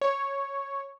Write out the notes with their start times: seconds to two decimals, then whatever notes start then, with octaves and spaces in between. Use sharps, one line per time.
0.01 C#5